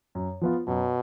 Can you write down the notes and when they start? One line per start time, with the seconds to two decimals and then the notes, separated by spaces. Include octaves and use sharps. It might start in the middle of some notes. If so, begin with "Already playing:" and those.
0.15 F#2
0.41 F3 B3 F4
0.68 F#2 B2